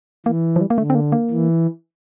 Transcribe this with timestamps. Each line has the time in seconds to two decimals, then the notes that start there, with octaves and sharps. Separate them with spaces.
0.26 E3 A#3
0.56 F3
0.61 G3
0.70 A#3
0.77 D3 A3
0.90 C4
0.95 A#3
1.12 A#3
1.30 E3